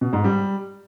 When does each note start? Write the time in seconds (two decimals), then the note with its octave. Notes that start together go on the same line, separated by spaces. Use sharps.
0.01 B2
0.13 G#2
0.24 G3